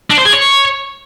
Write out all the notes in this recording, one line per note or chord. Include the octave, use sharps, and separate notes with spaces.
D4
C5
G#4
C#5